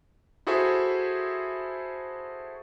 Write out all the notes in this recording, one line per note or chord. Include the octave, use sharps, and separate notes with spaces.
E4 F#4 G#4 A4 C5 E5